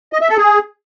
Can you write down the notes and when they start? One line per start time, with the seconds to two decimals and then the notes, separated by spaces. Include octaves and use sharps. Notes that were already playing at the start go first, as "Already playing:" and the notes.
0.13 D#5
0.21 E5
0.29 A4
0.37 G#4